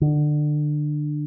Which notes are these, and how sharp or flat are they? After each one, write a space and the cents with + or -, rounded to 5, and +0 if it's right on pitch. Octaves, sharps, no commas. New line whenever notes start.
D3 +25